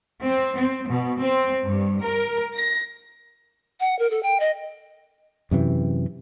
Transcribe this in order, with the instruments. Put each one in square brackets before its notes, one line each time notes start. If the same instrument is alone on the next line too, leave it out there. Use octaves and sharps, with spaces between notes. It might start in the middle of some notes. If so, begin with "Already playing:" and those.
[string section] C4
C4
B2
C4
G2
A#4
A#6
[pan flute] F#5
A#4
A4
G5
D#5
[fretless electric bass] F#2 C3 E3